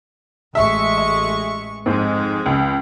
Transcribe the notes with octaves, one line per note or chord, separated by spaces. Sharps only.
A1 G#3 E5 C#6
E5
F2 G#2 G#3 C4
C#2